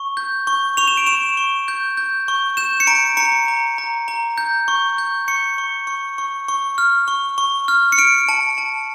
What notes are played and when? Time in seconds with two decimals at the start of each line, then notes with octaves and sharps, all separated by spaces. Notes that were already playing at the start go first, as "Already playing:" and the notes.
Already playing: C#6
0.17 G6
0.47 C#6
0.77 C#6 F7
0.87 E7
0.97 D7
1.07 C#6 E7
1.37 C#6
1.68 G6
1.97 G6
2.28 C#6
2.57 G6 E7
2.80 C#7
2.87 A#5 D7
3.17 A#5 C#7
3.48 A#5
3.78 A#5
4.08 A#5
4.38 G6
4.68 C#6
4.98 G6
5.28 C#6 C#7
5.58 C#6
5.87 C#6
6.18 C#6
6.48 C#6
6.78 F6
7.08 C#6
7.38 C#6
7.68 F6
7.92 C#7
7.98 F6 D7
8.29 A5
8.58 A5